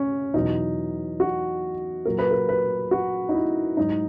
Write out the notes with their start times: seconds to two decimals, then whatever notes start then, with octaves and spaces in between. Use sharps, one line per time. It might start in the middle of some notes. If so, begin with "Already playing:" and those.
Already playing: C#4
0.34 E2 B2 F#3 D#4
1.20 F#4
2.05 A#2 F#3 A#4
2.19 B4
2.31 A#4
2.49 B4
2.91 F#4
3.29 D#4
3.34 E4
3.77 G#2 F#3 D#4